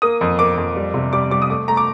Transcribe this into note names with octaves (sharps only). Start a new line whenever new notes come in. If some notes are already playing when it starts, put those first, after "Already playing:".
A#3 D#6
F2
A#3 D6
F2
G3
C3
G3 D6
G3 D6
D#6
A3 D6
A3 A#5
D6